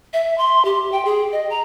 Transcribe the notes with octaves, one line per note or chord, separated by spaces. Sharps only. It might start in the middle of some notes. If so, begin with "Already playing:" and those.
E5
C6
G4
G5
G#4
D#5
A#5